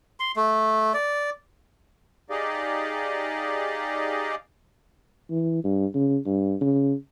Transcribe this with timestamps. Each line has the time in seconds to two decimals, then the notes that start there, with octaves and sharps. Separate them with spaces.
0.20 C6
0.36 A3
0.94 D5
2.30 D#4 G4 G#4 D5 D#5 F5
5.30 E3
5.64 G2
5.94 C#3
6.26 G2
6.61 C#3